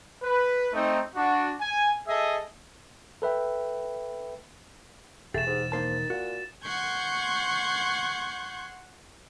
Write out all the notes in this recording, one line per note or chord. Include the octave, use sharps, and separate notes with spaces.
B4
A3 C4 D#4
D4 F#4
G#5
G#4 A4 D#5 E5
A4 B4 E5 G5
E1 A3 G4 G#4 A6 E7
G#2
D#3 A#3 C5 A5
A#2 F#4
F#5 C6 C#6 G6 G#6